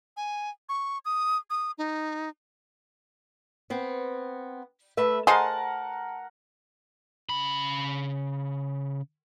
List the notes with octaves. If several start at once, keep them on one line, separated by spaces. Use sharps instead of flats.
G#5
C#6
D#6
D#6
D#4
B3 C4
A3 B4 E5
G#4 A#4 C5 D#5 F#5 A5 C6
C#3 B5